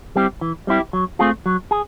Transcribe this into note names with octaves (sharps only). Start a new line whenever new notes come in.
G3 C4 E4 G4
E3
G3 C4 E4 G4
F#3
A3 C4 F4 G#4
F#3
G#4